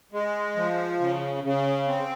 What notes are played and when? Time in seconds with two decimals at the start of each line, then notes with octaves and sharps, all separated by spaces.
0.12 G#3
0.56 F3
1.00 C#3
1.44 C#3
1.87 C4